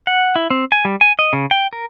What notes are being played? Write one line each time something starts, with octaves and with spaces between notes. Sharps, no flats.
F#5
E4
C4
G#5
G3
G#5
D#5
C#3
G5
A#4